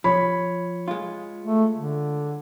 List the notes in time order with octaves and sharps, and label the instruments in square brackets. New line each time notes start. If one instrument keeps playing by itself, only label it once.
[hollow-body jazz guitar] F3 [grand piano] C#5 B5
[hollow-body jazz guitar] G#3 F4
[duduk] A3
D3